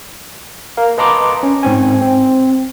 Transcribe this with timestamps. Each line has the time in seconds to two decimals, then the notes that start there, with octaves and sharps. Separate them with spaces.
0.77 A#4 F5
0.98 B4 D#5 A5 A#5 C6 D6
1.43 C#4
1.63 G#2 C4 G#5
2.01 C4